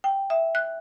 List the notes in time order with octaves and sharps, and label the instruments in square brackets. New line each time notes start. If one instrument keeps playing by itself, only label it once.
[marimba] G5
E5
F#6